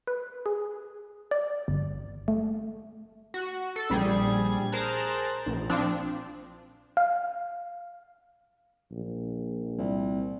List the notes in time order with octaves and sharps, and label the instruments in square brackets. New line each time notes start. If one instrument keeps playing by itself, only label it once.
[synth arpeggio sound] B4
G#4
D5
G1
A3
[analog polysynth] F#4
A4
A#1 G3 G#4 G#6
G#4 A#4 C5 A5 A#5 F#6
A#1
F3 C4 D4
[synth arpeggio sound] F5
[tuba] A#1
[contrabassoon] C2